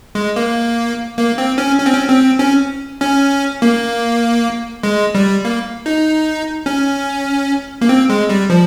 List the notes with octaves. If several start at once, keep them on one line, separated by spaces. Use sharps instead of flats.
G#3
A#3
A#3
C4
C#4
C#4
C4
C#4
C4
C#4
C#4
A#3
G#3
G3
A#3
D#4
C#4
A#3
C4
G#3
G3
F3